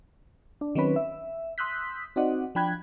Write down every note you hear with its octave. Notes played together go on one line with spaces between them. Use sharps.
D4
D#3 F#3 C4 C#4 B4
E5
C6 D#6 E6 F#6 G6 B6
C4 D#4 F#4 D5 D#5 F#5
F3 D4 G5 B5 F#6 G#6